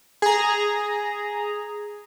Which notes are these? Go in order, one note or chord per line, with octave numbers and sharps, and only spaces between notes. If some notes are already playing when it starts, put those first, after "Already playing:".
G#4 A#5